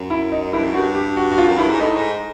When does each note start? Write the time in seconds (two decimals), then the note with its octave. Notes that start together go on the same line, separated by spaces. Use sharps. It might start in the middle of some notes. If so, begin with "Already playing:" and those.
Already playing: F#2
0.10 E4
0.32 D#4
0.53 G2 E4
0.64 F#2
0.74 G2 F#4
0.95 G4
1.17 F#4
1.32 F#4
1.38 F4
1.49 F#2
1.58 G2 E4
1.69 G#2
1.80 A2 D#4
1.96 G#2